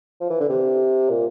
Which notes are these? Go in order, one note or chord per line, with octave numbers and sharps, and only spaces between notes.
F3
E3
D3
C3
A#2